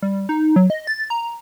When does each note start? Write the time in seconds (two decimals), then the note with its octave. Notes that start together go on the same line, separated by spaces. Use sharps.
0.02 G3
0.29 D#4
0.56 F#3
0.70 D#5
0.87 A6
1.10 A#5